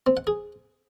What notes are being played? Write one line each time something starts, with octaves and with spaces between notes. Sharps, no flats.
C4
F#5
G#4